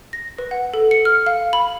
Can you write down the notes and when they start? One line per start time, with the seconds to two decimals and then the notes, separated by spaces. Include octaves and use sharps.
0.13 A#6
0.38 B4
0.51 F#5
0.74 A4
0.91 C#7
1.05 F6
1.26 F5
1.53 B5